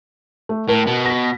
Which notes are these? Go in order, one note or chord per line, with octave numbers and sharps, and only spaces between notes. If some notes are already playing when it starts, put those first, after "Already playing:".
A3
A2 A#4
B2
A#6 B6